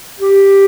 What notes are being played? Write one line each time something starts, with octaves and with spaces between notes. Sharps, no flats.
G4